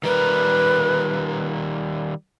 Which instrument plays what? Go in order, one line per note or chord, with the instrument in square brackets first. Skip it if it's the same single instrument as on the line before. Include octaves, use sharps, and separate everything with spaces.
[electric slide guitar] D#3 G3 A#4 [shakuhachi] B4